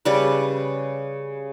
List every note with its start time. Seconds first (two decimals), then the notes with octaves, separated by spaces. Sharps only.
0.05 C#3 G3 B4